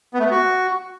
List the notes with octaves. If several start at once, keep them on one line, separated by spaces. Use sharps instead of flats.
B3
A3
B3
F#4